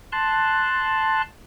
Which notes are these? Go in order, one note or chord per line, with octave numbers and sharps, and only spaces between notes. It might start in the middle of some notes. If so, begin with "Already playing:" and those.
A5 C6 F#6